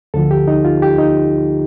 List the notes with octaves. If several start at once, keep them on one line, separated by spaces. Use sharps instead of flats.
D2 D3 F3 A4
G4
D#4
F4
G4
D#4